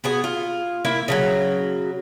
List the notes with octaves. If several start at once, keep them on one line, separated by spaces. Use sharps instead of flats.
B3 F#4 G#4
F4
A#3 E4 E5
C#3 F3 F#3